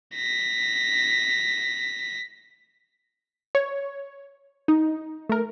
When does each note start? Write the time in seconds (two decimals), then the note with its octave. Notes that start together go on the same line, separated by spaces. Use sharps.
0.15 A#6 B6
3.55 C#5
4.68 D#4
5.29 A3 A#4